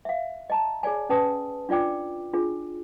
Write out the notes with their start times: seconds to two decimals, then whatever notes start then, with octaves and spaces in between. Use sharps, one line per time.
0.05 E5 F5
0.50 D#5 A5 A#5
0.83 G#4 C#5 D5 G#5
1.09 C#4 B4 A5 D#6
1.69 D4 F4 D5 G5 D6
2.33 D4 F4 G#4